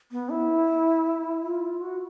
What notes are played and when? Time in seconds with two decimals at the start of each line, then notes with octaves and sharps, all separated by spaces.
0.12 B3
0.31 E4
1.44 F4
1.81 F#4